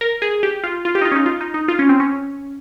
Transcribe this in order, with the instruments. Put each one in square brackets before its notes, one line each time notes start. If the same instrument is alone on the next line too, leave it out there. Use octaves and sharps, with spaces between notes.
[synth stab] A#4
G#4
G4
F4
F4
G4
D#4
F4
C#4
D#4
F4
D#4
D#4
F4
C#4
C4
C#4